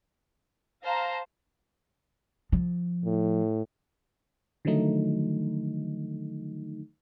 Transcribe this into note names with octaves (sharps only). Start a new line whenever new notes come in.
C5 F5 A5 A#5 A#6
F3
A2
D3 D#3 F3 F#3 A3 D#4